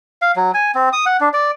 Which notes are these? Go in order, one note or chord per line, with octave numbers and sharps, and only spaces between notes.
F5
F#3
G#5
C4
D#6
F#5
D4
D5